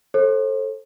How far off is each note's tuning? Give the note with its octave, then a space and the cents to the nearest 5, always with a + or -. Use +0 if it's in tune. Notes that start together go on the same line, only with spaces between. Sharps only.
A4 +0 C5 +40